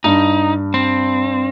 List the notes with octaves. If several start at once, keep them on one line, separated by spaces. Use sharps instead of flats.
G2 D#4
C4